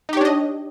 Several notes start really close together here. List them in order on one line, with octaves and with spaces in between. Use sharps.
D#4 G4 C#5 D4 D#5